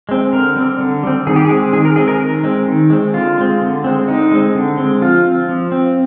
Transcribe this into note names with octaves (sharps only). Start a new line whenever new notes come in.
G#3 C4
D3 A#4
G3 C4
D3
G3 C4
D#3 G#4
G4
G#4
G#3 C4
D#3 G#4
A#4
G#3 C4 G#4
A#4
D#3
G#3 C4
D#3
G#3 C4
D3 F4
G#3 C4
D3
G#3 C4
D3 D#4
G#3 C4
D3
G#3 C4
F3 F4
C4
F3
C4